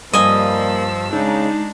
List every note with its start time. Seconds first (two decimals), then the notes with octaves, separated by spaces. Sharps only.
0.13 G2 F3 G3 A#3 D#5 G#5 E6
1.13 C#3 G#3 D4 D#4